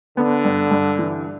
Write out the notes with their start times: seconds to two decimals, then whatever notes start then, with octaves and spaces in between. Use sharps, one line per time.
0.17 D3 B3
0.45 G2
0.71 G2
0.99 E3